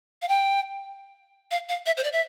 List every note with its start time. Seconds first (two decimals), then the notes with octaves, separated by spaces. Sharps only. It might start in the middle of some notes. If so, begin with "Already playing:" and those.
0.22 F5
0.29 G5
1.51 F5
1.69 F5
1.86 E5
1.97 C5
2.04 D5
2.13 E5